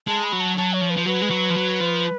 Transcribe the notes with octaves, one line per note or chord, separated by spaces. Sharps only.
G#3 A5
B5
F#3
A5
F#3 A5
C#5
F3
B4
F3
F#3 B4
G#3
F#3
F3
F#3
F3